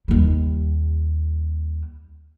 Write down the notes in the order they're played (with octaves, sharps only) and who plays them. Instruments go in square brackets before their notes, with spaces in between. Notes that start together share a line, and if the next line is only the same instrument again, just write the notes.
[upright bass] D#2 G3